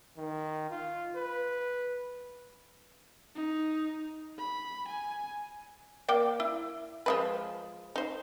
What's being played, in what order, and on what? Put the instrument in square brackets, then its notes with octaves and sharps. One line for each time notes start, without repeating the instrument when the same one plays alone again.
[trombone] D#3
F4
B4
[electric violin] D#4
B5
G#5
[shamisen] A#3 D5 G5
E4
F3 G#3 B4
D#4 C5